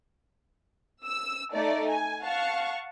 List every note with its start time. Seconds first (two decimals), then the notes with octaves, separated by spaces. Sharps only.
1.04 E6
1.53 A3 D#4 D5
1.89 G#5
2.22 F5 F#5 A5 C#6